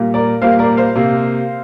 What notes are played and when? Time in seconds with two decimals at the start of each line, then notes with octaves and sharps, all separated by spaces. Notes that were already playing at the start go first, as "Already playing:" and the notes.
Already playing: A#2 G3 A#3
0.14 A#4 D5
0.42 A#2 G3 A#3 C5 F5
0.59 A#4 D5
0.77 C5 F5
0.96 C3 A#3